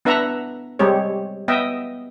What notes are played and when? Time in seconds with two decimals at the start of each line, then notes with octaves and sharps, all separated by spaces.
0.05 B3 D4 B4 E5 F#5 A#5
0.79 G3 G#3 C4 G4 C#5
1.48 B3 D#5 E5 G5